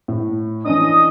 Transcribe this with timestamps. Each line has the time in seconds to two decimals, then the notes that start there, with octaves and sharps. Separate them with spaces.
0.08 A2
0.65 E3 C#4 D4 D#5 D#6